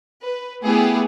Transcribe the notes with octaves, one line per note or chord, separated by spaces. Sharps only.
B4
A3 B3 E4 G4 G#4